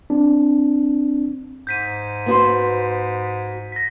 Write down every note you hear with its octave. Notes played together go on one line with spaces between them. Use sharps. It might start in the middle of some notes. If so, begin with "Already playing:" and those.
C4 D4
G#2 G6 B6 D#7
B3 F#4 C5
A#6 B6